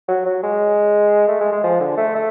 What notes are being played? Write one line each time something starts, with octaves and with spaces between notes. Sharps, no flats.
F#3
F#3
G#3
A3
G#3
G#3
F3
D3
A3
A3